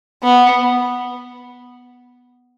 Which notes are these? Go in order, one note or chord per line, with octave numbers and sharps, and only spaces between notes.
B3